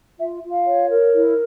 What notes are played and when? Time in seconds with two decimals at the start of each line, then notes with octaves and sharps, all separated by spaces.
0.19 F4 E5
0.43 F4
0.51 F5
0.66 C#5
0.90 A#4
1.15 E4